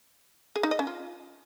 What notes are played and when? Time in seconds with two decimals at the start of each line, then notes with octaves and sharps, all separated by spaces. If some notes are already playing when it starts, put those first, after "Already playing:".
0.56 G#4
0.63 D#4
0.71 D#5
0.79 C#4
0.87 F4